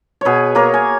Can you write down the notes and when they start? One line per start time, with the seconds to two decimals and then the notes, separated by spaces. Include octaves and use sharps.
0.21 B2 G#4 B4 C#5
0.55 A#3 A#4 C#5
0.74 G#5